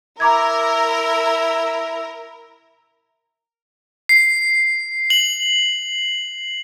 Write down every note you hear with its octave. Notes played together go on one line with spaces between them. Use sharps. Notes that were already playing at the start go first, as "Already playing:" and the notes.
E4 A#4 A#5 D6 G#6
C7
F#7